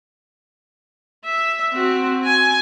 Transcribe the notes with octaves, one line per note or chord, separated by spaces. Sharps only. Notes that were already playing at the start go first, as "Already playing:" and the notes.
E5
C4 F#4
G#5